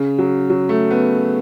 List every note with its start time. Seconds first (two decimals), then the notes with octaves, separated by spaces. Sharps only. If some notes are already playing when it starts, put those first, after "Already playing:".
Already playing: C#3
0.19 F#3
0.50 F#3
0.69 A3
0.91 B3